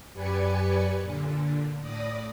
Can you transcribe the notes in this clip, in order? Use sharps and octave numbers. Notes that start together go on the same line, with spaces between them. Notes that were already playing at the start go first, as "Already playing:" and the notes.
F#2 G4 B4 D5 G#5 C#7
A#2 D3
A2 D5 D#6 A#6